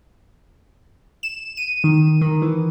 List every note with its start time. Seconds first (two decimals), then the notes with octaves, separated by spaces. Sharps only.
1.23 E7
1.57 D#7
1.84 D#3
2.21 D#3
2.42 E3